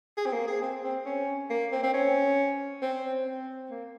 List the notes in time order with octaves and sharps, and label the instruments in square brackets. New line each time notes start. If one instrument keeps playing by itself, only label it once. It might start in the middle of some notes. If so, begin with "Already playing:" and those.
[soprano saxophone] G#4
C4
A#3
G#4
C4
C4
C#4
A#3
C4
C4
C#4
C4
C4
A#3